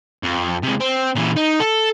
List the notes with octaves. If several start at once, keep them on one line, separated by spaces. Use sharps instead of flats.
F2
C3 G#3
C4
A#2 E3
D#4
A4